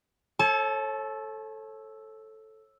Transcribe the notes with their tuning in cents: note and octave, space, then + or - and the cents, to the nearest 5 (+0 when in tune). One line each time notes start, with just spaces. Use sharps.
A4 +0 C#5 -30 A5 -35